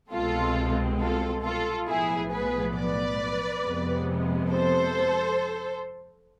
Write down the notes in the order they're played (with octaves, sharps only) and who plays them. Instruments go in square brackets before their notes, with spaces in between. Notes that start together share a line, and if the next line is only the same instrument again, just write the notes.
[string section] C2 B2 G#3 C4 F4 A4
F4 A4
F4 A4
B1 A2 F3 B3 E4 G#4
G#4 B4
B4 D5
F2 C3 G#3 B3
A4 C5